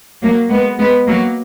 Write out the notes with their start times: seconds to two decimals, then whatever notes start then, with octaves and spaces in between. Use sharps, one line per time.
0.22 F#3 A#3
0.50 G#3 B3
0.79 G#3 B3
1.07 F#3 A#3